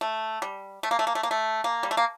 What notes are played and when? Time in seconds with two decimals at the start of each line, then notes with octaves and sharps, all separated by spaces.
0.01 A3
0.42 G3
0.83 A3
0.91 A#3
0.99 A3
1.07 A#3
1.15 A3
1.23 A#3
1.31 A3
1.64 A#3
1.83 G3
1.91 A3
1.97 A#3